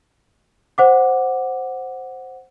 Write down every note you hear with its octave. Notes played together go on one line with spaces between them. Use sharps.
C5 F#5 D6